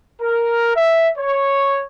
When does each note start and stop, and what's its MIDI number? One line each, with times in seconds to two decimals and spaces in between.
0.21 0.72 70
0.75 1.10 76
1.17 1.82 73